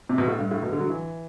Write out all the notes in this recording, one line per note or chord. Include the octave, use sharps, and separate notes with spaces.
C3
B2
A2
G2
A2
B2
D3
F#3
E3